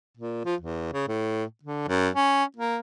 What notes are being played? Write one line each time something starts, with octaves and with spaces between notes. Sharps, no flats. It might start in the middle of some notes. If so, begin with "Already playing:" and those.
A#2
F3
E2
C#3
A2
D3
F#2
C#4
A#3